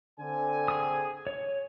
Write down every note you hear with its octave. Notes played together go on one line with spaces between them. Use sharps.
D3 C4 G#5
G#4 D#6
C#5